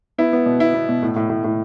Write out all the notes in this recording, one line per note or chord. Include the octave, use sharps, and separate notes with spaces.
B3 E4
B3
B2
B2 E4
B3
B2
A2
A2
A2
A2